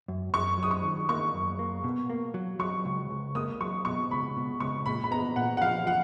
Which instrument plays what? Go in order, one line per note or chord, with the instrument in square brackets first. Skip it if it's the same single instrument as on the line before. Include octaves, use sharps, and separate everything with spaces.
[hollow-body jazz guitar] F#2
[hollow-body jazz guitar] F#2 [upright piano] C#6
[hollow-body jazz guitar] F#3 [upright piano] D#6
[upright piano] C#6
[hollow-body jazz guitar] D#3
[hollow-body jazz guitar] A#3 [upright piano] C#6
[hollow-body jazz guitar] F#2
A#3
B2
A#3
F#3
[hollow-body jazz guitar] F#3 [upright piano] C#6
[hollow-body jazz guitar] C#2
C#2
[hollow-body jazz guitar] A#3 [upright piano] D#6
[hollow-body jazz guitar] F#3 [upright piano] C#6
[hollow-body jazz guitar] B2 [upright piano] C#6
[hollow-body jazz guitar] C#2 [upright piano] B5
[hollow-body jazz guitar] B2
[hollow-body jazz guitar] C#2 [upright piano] C#6
[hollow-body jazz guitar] A#2 [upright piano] B5
[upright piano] B5
[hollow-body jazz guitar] B3 [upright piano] A#5
[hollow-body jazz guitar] A#2 [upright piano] F#5
[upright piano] F#5
[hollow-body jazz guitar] F3 [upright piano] F5
[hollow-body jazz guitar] F3 [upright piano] F#5